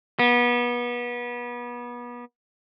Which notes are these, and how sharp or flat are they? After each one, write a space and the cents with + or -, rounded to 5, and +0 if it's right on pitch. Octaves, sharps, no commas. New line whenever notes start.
B3 -30